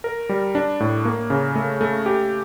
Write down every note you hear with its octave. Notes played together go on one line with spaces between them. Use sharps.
A#4
G3
D4
A2
A#3
C#3
A3
A3
G4